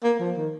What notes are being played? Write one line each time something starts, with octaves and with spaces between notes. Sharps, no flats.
A#3
F3
D#3